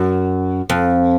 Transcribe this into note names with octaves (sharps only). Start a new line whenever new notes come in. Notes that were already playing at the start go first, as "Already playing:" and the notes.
Already playing: F#2
F2